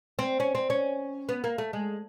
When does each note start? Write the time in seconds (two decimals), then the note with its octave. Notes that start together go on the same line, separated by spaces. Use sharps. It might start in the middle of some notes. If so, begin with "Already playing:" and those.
0.19 C4
0.40 C#4
0.55 C4
0.70 C#4
1.29 B3
1.44 A#3
1.58 A3
1.73 G#3